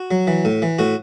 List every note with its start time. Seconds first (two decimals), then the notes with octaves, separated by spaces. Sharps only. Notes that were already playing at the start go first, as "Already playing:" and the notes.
Already playing: F#4
0.11 F#3
0.27 E3
0.45 A2
0.62 E3
0.79 A2 F#4